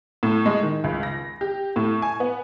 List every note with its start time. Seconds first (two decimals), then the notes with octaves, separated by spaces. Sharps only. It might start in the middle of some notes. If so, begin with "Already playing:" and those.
0.23 A2
0.46 G#3
0.62 D#3
0.84 C#2
1.03 A#6
1.41 G4
1.76 A2
2.02 G#5
2.20 B3